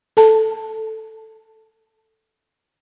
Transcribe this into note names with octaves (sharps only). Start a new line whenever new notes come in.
A4 A5